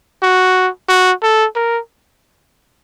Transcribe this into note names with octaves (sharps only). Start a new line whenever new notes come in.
F#4
F#4
A4
A#4